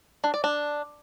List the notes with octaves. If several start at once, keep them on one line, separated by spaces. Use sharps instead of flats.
D4
D5
D4